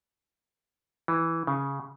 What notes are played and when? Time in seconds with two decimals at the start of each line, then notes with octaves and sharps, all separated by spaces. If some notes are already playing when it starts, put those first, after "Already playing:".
1.08 E3
1.47 C#3